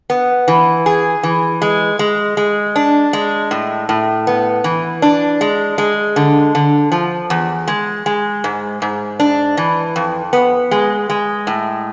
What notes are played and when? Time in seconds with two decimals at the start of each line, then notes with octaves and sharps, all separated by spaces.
0.10 B3
0.48 E3
0.86 G#4
1.23 E3
1.62 G#3
1.99 G#3
2.37 G#3
2.76 D4
3.13 G#3
3.51 A2
3.89 A2
4.27 B3
4.64 E3
5.02 D4
5.41 G#3
5.78 G#3
6.16 D3
6.55 D3
6.92 F3
7.30 E2
7.68 G#3
8.06 G#3
8.44 G#2
8.82 G#2
9.20 D4
9.57 E3
9.96 F2
10.33 B3
10.71 G#3
11.10 G#3
11.47 A2